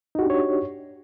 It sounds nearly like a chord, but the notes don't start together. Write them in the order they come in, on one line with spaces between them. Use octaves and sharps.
D#4 F#4 G4 D4 C#5